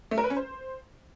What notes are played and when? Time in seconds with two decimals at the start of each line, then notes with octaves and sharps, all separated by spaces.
0.11 A3
0.18 A#4
0.24 B4
0.30 C#4
0.37 C5